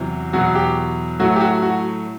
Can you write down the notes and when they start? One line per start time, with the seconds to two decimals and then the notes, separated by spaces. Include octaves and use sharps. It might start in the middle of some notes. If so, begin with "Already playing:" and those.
Already playing: E2 C3 F#3
0.33 E2 B2 F#3 F#4
0.55 G4
1.20 A2 F#3 A3 F#4
1.36 G4
1.41 F#4
1.62 F#4